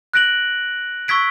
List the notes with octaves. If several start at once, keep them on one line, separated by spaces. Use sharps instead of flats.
F#6 A#6 D7 F#7
C#6 E6 G#6 B6 D7